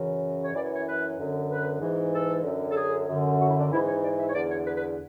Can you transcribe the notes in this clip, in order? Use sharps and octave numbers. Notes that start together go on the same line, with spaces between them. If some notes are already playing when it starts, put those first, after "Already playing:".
Already playing: F#2 C#3 E3
C#5
F#2 E3 D5
C#5
C#5
B4
F#2 D3
B4
G#2 E3
A4
F#2 D3
A4
G#4
F#2 D3
F#4
E4
D4
G#2 E3 E4
C#5
D5
E5
C#5
E2 D3 D5
C#5
B4
B4